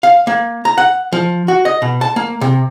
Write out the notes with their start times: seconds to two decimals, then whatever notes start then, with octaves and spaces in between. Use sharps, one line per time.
0.03 F5
0.27 A#3
0.65 A#5
0.78 F#5
1.12 F3
1.48 F#4
1.65 D#5
1.82 B2
2.01 A5
2.16 A#3
2.41 C3